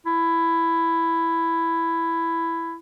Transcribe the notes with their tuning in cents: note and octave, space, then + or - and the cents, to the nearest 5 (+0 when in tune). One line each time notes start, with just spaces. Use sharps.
E4 +10